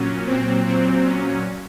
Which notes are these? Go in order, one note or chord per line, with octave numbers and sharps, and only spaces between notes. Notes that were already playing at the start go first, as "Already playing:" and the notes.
Already playing: A#2 F#3 C#4
C4
A#2 F#3 C4
C#4